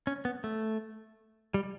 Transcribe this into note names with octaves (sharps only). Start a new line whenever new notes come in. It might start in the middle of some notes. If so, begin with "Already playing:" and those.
C#4
B3
A3
G3